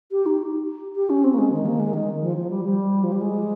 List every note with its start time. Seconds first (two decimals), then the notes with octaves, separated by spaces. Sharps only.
0.12 G4
0.26 D#4
0.95 G4
1.10 C#4
1.24 C4
1.34 A#3
1.38 G#3
1.52 D#3
1.65 A#3
1.80 G#3
1.93 D#3
2.22 F3
2.37 F3
2.50 G3
2.65 G3
3.03 F3
3.12 G3
3.21 G#3